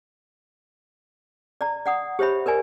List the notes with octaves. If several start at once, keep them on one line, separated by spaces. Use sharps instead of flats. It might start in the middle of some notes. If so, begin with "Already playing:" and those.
D5 A#5
D5 F#5 D#6
G4 C5 C#5 E5 B5
A#4 B4 D5 G#5